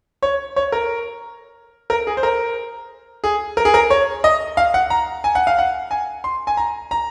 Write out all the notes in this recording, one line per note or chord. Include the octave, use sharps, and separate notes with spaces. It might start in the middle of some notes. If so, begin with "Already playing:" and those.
C#5
C#5
A#4
A#4
G#4
C5
A#4
G#4
A#4
G#4
A#4
C#5
D#5
F5
F#5
A#5
G#5
F#5
F5
F#5
G#5
C6
G#5
A#5
A#5